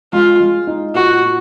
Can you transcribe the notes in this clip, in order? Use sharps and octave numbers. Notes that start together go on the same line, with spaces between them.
G#3 F4
G#3
D#4
A#2 F#4
A#2